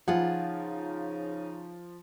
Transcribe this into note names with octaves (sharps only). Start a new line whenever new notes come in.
C#3 F3 D#4 F4 G#4 F#5